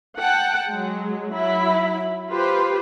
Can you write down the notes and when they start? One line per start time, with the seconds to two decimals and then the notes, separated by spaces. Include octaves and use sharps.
0.18 F#5 G5 A5
0.69 F#3 G#3
1.32 F#3 E4 B5
2.30 F4 G4 B4 C5